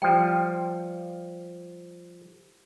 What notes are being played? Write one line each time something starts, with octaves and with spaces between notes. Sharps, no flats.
F3 G3 G5